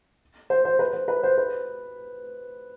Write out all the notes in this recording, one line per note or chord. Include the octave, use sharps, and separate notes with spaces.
C5
C5
B4
C5
B4
C5
B4